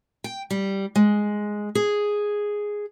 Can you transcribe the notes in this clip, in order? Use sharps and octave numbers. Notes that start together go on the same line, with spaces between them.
G5
G3
G#3
G#4